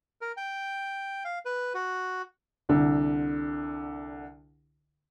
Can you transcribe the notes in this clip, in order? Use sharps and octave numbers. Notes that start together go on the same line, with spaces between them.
A#4
G5
F5
B4
F#4
C2 D3